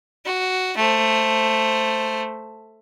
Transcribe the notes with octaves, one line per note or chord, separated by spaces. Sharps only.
F#4
A3 C5